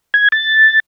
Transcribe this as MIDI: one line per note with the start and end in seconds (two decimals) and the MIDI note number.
0.14 0.28 92
0.32 0.80 93